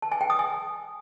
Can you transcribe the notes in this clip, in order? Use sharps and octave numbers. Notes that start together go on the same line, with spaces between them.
A5
G#5
G5
D#6
G#5